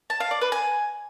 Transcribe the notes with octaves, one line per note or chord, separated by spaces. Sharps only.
A5
F5
D5
B4
G#5